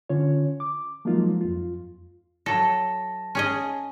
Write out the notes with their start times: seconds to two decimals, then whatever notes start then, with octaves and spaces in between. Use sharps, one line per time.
0.09 D3 C#4 F4 C#5
0.60 D6
1.05 F3 F#3 G#3 A#3 D#4 F4
1.41 F2 F4
2.46 F#3 A4 A5 A#6
3.35 C#4 G#4 D#5